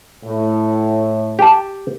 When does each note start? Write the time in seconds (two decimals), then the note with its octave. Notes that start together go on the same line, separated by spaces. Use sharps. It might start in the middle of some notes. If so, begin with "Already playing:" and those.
0.25 A2
1.39 G4 A5